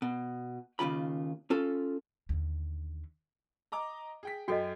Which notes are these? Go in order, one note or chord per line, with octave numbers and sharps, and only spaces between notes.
B2
D#2 A#2 C#3 F4 B5
C#4 F4 A4
D#2 D3
D#5 A#5 D6
G#4 G5 B6
F#2 F#4 A4 D#5 G5 C7